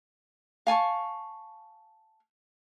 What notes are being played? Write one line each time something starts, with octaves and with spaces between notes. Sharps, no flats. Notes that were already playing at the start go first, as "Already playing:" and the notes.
F5 G#5 A5 C#6